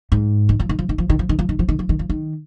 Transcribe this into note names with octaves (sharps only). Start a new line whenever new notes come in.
G#2
D#3
F3
D#3
F3
D#3
F3
D#3
F3
D#3
F3
D#3
F3
D#3
F3
D#3
F3
D#3